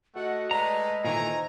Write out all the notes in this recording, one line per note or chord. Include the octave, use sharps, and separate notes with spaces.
A3 F#4 A4 D#5 F#5
G#3 A3 B4 D5 A#5
A#2 D#3 E3 A4 C5 G#5 A#5